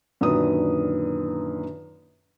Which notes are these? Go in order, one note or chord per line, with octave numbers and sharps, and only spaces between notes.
F#2 A#2 D3 D#3 B4 D#6